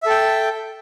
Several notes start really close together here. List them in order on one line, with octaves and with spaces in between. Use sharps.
E5 A4 G5